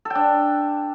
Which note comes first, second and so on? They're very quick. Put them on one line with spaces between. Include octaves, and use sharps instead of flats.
A4 G5 D4